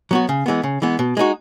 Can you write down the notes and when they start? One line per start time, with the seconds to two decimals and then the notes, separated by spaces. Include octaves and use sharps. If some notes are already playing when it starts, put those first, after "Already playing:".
0.11 F#3 B3 F#4
0.29 C#3
0.46 E3 G#3 B3
0.63 C#3
0.82 E3 G#3 B3
0.99 B2
1.17 G#3 D#4 F#4